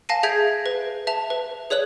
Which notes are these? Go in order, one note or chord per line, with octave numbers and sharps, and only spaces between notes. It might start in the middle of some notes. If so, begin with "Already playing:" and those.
F5 G#5 A5 A#6 C7 D#7
G#4 E5 G6 G#6 B6 D7
B4
E5 A5 F7
B4
G#4 C#5 D5 F#6 F#7